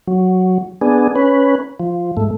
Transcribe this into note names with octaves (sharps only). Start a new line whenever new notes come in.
F#3
B3 D4 G#4
C#4 B4
F3
G#2 A3